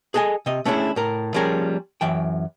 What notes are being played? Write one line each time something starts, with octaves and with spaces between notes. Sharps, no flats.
G#4 A4 D#5 F5 G#5
C3 D#5
A3 C#4 D4 E4 G#4
A2 A#4
F3 G3 A#3 C#4 G#4 A#4
F#2 E3 G5